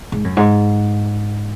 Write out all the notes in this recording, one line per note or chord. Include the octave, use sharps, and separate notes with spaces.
G#2
F#2
G#2